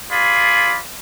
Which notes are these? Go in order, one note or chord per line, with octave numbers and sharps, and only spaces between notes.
F4 G#4 D5 B5